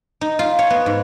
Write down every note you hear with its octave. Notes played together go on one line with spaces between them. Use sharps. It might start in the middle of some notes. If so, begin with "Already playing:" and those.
D#4
F4
C#5
B3
G#2